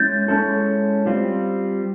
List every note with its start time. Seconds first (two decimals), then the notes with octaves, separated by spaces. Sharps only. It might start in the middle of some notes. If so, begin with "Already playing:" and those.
Already playing: G#3 C#4 E4 G6 A6
0.28 G#3 C#4 E4 A4
1.06 G3 C4 F4